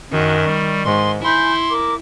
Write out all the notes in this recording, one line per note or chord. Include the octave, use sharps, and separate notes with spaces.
F#2 D#3 F#4
G3 C#6
G#2 C6
E4 G#5 B5 C6 G6
A#4 D6